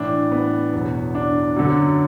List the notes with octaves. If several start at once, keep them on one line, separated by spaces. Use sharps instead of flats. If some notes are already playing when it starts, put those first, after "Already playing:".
Already playing: A2 E3 D4
B3
E2 B2 F#3
D4
F#2 D3 F#3